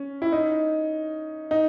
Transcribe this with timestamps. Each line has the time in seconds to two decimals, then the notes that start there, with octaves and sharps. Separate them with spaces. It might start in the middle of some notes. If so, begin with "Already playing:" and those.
Already playing: C#4
0.22 E4
0.32 D#4
1.51 D#4